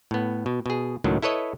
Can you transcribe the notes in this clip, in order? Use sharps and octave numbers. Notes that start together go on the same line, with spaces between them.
A2 B3
B2
B2 G#4
C#2 A2 D#3 F#3
E4 A4 B4 C#5 D#5